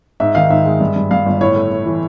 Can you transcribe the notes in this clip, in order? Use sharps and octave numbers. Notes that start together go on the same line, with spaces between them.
G#2 E5
D#3 F5
G#2 E5
G#3
G2
G2
G2 F5
G1
A2 C#5
A3
A3
E3